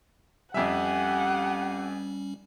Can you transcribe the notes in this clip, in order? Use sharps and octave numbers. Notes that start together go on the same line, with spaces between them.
F2 G3 C#4 G4 E5 F#5 G#5